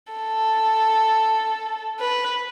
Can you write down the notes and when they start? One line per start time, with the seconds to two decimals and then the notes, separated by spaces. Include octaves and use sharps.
0.13 A4
2.00 B4